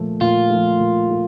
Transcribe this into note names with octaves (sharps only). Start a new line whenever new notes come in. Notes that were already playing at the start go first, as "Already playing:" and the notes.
Already playing: A#2 F3 A3
A#2 F4
F3 A3
A#2
A3